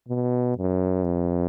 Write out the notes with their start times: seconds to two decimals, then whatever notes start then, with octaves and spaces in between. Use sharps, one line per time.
0.08 B2
0.57 F#2
1.04 F2